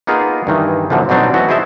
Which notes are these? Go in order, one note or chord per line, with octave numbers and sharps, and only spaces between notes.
A#3 B3 D#4 F4 G#4 A#4
G2 D#3 E3
F#2 A#2 D3 E3 F3
B2 F#3 G3 C4 D4 D#4
E3 A3 B3 F#4
E4 G#4 C5 D#5 E5 A5